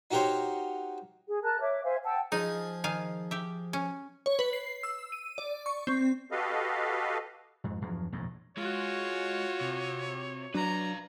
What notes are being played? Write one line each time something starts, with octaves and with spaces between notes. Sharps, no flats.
D#4 F#4 G4 A#4 C5 C#5
G#4
A#4 A5 F#6
C#5 E5 D6
C5 E5 F5 G#5
F#5 G5 A5 E6
F3 D#4 G#4
D#3 F5 G#5
G4 E5
C#4
C#5
B4
C7
E6
D#7
D5
C#6
C4
F#4 G4 A4 B4 D#5 F5
F2 G#2
E2 G2 F3 F#3
E1 A#1 F#2 A2
G#3 F4 F#4 C#5
C3
F#3 D4 B4 F5 A#5